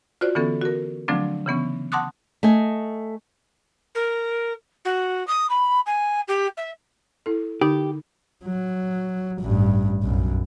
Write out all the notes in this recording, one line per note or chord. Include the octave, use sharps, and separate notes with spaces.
F4 F#4 C5 D5
D3 E3 B3 C#4 A4
F#4 A#4
D3 F3 F#3 A3 C4 D4
C#3 E3 B3 C#4
F#5 A5 C6 D6 D#6 F#6
A3 D#5 G#5
A#4
F#4
D#6
B5
G#5
G4
E5
E4 A4
D3 D#4 G4
F#3
A1 G2
B1 F#2